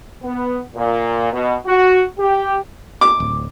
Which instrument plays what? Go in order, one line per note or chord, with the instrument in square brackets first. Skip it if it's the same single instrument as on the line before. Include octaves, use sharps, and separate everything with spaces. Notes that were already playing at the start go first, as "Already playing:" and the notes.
[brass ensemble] B3
A#2
B2
F#4
G4
[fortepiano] D6
[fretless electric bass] D1